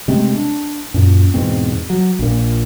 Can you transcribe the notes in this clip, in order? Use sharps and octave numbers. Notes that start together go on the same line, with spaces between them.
C3 G#3 A3 C4
D4
F#2 A#2
E2 G#2 B2 C4
F#3
A#1 A#2